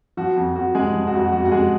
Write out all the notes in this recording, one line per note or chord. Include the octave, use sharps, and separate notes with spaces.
F3 F#4
F2
F2 F#4
C3 G#3 G#4
F3
F#4
F2
F#4
F2 F#4
F#4
C3 G#3 G#4